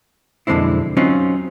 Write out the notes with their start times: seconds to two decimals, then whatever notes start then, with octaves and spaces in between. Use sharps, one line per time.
0.47 B1 F2 D3 G#3 C4 E4
0.97 F#3 C4 C#4 D#4 F4